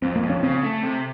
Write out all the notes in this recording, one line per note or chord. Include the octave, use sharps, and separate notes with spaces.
F2 C4
A#3
F2
C#4
C#3 C4
A3
C3